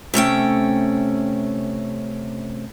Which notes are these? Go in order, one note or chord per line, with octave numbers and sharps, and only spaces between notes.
C3 A3 C#4 G5